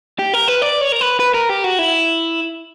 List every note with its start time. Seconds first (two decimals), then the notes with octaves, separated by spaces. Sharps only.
0.19 G4
0.34 A#4
0.48 B4
0.62 D5
0.81 C#5
0.92 A#4
1.01 B4
1.20 B4
1.34 A#4
1.49 G4
1.64 F#4
1.79 E4